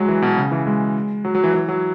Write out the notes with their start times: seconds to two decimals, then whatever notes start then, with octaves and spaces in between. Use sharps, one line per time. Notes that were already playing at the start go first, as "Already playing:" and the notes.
Already playing: F#3 G#3
0.08 E3
0.22 B2
0.37 C#3
0.51 E3
0.67 G#3
1.25 F#3
1.35 F#3
1.44 E3
1.54 E3
1.69 F#3